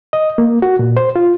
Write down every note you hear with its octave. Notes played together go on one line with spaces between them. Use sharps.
D#5
A#3
F#4
A#2
C5
F4